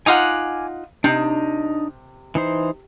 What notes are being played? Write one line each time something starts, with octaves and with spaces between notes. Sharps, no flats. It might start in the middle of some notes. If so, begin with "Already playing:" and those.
D#4 F4 F#5 G#5 D6 F6
C3 D4 D#4 D#5
E3 D#4 C5